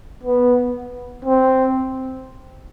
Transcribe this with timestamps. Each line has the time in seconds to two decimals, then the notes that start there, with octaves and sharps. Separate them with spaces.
0.23 B3
1.25 C4